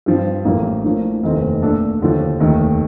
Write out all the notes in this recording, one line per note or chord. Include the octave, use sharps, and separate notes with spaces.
G2 F3 C4
A1 A2 F3 A#3 F4
A2 F3 A#3 D4
F1 D#2 D#3 A3 C4
A#2 A3 D4 A4
D#2 D3 F3
F1 D#2 D#3 A3